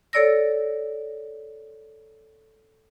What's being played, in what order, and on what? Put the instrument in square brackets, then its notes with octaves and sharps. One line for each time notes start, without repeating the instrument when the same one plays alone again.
[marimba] A4 C#5 D5 E6 A#6